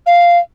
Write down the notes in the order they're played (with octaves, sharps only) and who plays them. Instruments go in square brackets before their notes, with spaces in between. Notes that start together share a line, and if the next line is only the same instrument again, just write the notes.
[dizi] F5